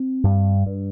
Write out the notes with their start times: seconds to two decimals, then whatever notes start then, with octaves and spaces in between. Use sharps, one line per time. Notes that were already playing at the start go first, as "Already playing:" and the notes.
Already playing: C4
0.24 G2
0.66 G2